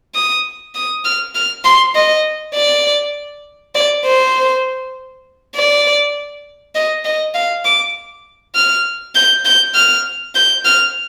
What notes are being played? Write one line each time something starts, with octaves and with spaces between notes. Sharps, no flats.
D#6
D#6
F6
F6
C6
D#5
D5
D5
C5
D5
D#5
D#5
F5
D6
F6
G6
G6
F6
G6
F6